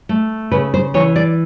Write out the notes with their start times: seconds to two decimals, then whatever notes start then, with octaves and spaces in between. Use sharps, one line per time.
0.09 A3
0.51 C#3 B4
0.74 C5
0.94 E3 C#5
1.16 D5